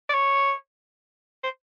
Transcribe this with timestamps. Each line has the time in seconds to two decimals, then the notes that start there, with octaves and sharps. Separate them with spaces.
0.09 D5
0.14 C#5
1.43 C5